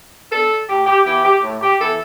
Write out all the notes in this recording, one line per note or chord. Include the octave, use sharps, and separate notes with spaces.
B3 D4 A4
A2 G4
G4
E3 B3 E4 G4
G4
A2
G4
E3 B3 E4 A4